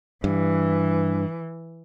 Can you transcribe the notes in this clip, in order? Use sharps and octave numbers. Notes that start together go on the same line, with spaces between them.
G2 E3